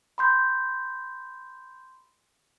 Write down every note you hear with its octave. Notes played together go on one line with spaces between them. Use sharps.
B5 C6 G6